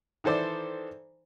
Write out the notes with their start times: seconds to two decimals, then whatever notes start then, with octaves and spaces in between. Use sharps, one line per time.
0.24 D#3 E3 A4 C5 D5